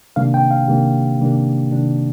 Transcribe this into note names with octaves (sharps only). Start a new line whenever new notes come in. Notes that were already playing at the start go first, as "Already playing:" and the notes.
C3 D#3 G3 A#3 D4 F5
G5
F5
C3 D#3 G3 A#3 D4 G4
C3 D#3 G3 A#3 D4
C3 D#3 G3 A#3 D4